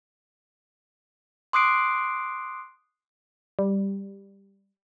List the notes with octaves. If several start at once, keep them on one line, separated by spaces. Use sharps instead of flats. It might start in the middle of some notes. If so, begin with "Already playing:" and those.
C6 D6 D#6 F#6 C7 D7
G3